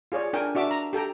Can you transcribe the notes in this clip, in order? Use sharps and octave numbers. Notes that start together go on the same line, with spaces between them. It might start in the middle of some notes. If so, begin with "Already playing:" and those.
F4 G#4 C#5 D5
D4 A#4 G5 G#5
D4 F#4 E5 D6
A#5
G4 A4 G5 A#5